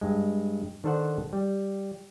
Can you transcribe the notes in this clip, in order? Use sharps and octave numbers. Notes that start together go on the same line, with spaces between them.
G2 G#3
D#3 D4 A4 C5 F#5
G3